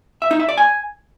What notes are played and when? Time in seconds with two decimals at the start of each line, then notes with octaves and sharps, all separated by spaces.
0.22 E5
0.31 D#4
0.40 E5
0.49 D5
0.57 G#5